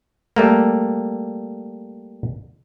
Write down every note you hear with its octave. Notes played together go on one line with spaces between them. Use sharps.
G3 A3 A#3